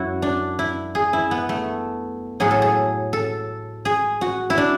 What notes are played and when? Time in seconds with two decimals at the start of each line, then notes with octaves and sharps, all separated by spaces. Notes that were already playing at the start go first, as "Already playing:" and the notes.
Already playing: F#2 E4 F#4
0.22 D4
0.59 E4
0.95 G#4
1.13 E4
1.31 B3
1.49 A3
2.40 A2 F#3 G#4
2.51 A4
2.62 G#4
3.13 A4
3.85 G#4
4.21 F#4
4.50 E4
4.58 D4